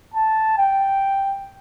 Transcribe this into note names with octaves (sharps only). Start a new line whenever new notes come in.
A5
G5